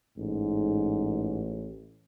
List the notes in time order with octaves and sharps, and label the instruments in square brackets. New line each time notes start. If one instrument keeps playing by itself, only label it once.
[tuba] A1 [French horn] G#2